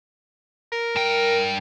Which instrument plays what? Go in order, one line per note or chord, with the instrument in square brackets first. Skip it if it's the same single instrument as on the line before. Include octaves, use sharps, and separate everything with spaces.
[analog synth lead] A#4
[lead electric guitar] G2 G5